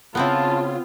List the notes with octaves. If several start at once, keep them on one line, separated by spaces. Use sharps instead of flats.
C#3 B3 C4 E4 F4 A5